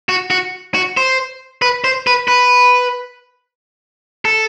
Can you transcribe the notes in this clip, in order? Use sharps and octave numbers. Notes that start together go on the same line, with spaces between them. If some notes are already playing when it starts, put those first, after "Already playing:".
F#4
F#4
F#4
C5
B4
C5
B4
B4
A4